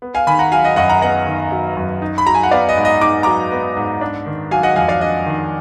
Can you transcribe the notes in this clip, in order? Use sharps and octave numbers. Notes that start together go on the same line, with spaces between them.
B3
F5 G#5
D#3 G#5 B5
F#5 A#5
F#3 F5 G#5
D#5 F#5
F#2 D#5 F#5
F#5 A#5
B3 D#5 F#5
D#3
F#3
F#2
D#4
B5
F#3 A#5
G#5
F#5
B3 D5 F5
D#5
G#2
D#5
D#4 D6
F#3 A#5 D6
B3
G#2
D4
D#3
F#3 F5 G#5
D#5 F#5
F2 F5 G#5
D5 F5
D4 D#5
D#3